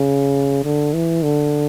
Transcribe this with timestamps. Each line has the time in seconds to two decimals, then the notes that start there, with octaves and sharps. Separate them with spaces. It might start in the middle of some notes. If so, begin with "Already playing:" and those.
Already playing: C#3
0.64 D3
0.94 E3
1.23 D3